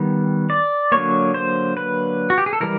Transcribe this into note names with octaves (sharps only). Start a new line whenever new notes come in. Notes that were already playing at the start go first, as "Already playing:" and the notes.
Already playing: D#3 G3 B3
D5
D3 F#3 A#3 C#5
C5
B4
F#4
G4
G#4
A4
E3 G3 A#4